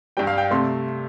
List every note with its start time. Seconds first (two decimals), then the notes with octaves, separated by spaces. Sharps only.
0.17 G2 G3 G5
0.27 F5
0.38 G5
0.51 C3 A3 C6